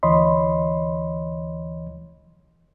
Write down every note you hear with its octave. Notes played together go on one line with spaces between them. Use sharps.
D2 E3 C#5 D#5 B5 C6